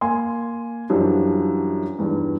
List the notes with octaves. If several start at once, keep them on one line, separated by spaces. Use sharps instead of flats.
A#3 G#5 C6
F#2 E3 F3 G3 D4 F#4
E2 G2 D#3